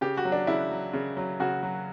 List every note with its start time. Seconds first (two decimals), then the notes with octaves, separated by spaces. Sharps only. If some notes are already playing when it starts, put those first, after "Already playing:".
0.01 C#3 G4
0.17 F#4
0.25 F#3
0.32 D4
0.47 C#3 E4
0.71 F#3
0.93 C#3
1.17 F#3
1.40 C#3 F#4
1.63 F#3